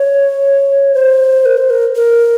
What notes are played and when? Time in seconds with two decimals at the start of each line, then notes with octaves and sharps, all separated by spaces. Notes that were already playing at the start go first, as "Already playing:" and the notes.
Already playing: C#5
0.94 C5
1.46 A#4
1.57 C5
1.70 A#4
1.96 A#4